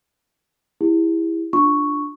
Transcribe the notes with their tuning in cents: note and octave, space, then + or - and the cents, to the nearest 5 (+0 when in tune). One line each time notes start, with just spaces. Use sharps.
E4 +0 G4 +45
D4 +5 F4 +0 C#6 +0